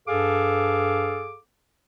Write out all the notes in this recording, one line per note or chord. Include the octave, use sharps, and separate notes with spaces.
G2 G#4 A4 F5 D6